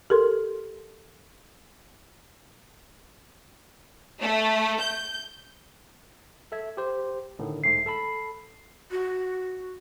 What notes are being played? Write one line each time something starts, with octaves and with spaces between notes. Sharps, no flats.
G4 A4 A#4 C6
A3
G6
A4 E5 G#6
G4 C5
A2 D3 D#3
B1 G#2 A3 C7
A4 A5 B5
F#4